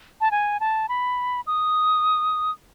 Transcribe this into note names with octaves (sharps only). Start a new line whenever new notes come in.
A5
G#5
A5
B5
D#6